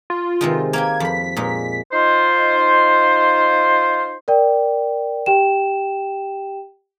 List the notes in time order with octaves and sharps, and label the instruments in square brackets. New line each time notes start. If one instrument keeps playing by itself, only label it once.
[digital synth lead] F4
[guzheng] C3 D#3 G#3
[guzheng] A#3 G4 G5 [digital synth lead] G#6
[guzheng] F2 B5 [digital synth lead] B6
[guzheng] A#2 G#3 D#4
[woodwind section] D#4 F4 C5
[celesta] A#4 D5 G5
G4 G5 E7